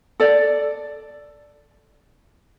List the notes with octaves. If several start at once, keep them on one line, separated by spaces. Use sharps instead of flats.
A4 D5